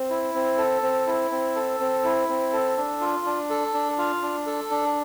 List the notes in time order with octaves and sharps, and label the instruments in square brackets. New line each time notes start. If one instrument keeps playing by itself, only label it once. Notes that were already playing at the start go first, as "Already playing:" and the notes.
Already playing: [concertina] C4
E4
C4
A4
C4
E4
C4
A4
C4
E4
C4
A4
D4
F4
D4
A4
D4
F4
D4
A4
D4